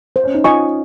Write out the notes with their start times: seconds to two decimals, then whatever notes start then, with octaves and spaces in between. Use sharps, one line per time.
0.16 C5
0.24 C#4
0.34 D#4
0.44 F4 D#5 G#5 C#6